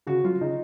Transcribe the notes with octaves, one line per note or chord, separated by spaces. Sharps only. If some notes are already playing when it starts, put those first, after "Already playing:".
C#3 F#4
F#3 F4
C#3 D#4